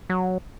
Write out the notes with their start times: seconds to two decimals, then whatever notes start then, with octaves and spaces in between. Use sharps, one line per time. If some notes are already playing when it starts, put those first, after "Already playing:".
0.10 F#3